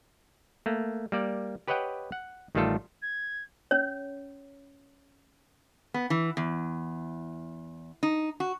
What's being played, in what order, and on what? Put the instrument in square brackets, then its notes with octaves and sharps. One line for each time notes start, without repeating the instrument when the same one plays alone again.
[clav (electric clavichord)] A3 A#3
G3 A#3 D5
G4 B4 C#5 D#5 F#5 G5
F#5
A1 D#3 G3 A3 F4 A4
[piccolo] G#6
[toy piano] C#4 C#5
[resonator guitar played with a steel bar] B3
E3
E2
D#4
F#4